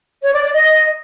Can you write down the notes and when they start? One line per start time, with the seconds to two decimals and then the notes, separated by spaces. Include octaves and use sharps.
0.23 C#5
0.33 D5
0.43 D5
0.53 D#5